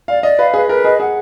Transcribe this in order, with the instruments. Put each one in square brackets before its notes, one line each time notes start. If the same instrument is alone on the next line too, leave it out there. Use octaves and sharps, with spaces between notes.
[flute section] D5 [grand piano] F5
[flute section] D5 [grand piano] D#5
[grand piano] B4 [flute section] F5
[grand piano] G#4 [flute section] B4
[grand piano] A#4 [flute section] B4
[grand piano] G#4 [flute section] D#5
[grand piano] G#4 [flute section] F#5